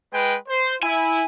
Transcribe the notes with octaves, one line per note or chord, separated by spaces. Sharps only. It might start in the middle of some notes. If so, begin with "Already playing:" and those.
G#3 B4 G5
C5
E4 G#5